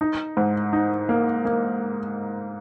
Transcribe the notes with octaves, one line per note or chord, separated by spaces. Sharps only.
D#4
G#2
D#4
A#3
A#3